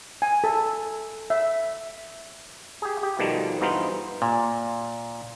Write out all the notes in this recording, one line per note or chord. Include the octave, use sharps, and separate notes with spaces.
G#5
A4
E5
G4 G#4
G4
B2 D#3 F3 G3 A3
G2 E3 B3 D#4 F4 C5
A#2